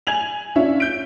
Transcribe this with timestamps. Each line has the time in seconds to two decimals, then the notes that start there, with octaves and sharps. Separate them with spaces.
0.07 G#5 G#6 F7 F#7
0.56 C#4 D4 F4 E5
0.80 G6 D7